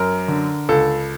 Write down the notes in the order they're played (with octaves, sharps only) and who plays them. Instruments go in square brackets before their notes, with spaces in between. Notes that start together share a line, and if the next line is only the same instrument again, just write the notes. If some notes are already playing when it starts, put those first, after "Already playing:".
Already playing: [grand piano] F#2 A#4
D3
C#2 A4